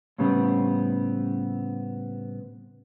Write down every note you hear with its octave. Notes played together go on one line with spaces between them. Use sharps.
A2 C#3 G3 B3 C4